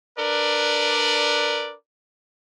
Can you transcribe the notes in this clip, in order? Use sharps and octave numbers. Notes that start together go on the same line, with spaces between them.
D4 A#4 B4 D5